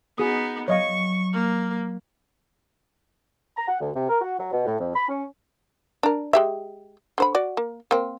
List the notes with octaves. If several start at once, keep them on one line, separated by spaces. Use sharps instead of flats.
B3 D#4 F#4 G#4 D#6
F#3 C#5 D#5 F5 C#6
A#3
A#5
F#5
D2
C3
A#4
F#4
F#3
B2
A2
F2
B5
C#4
D4 A#4
G#3 G4 E5
D3 C5 B5
F#4 D5
A#3
A#3 C4